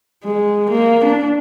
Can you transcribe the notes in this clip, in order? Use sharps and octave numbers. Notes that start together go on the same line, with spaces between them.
G#3
A#3
D4